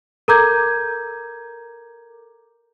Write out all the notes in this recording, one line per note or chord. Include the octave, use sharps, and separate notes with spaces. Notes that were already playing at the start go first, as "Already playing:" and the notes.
A4 A#4 A#5 D6 G6 G#6